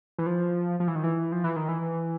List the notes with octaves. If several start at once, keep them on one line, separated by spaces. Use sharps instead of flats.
E3
F3
F3
E3
D#3
E3
F3
E3
D#3
E3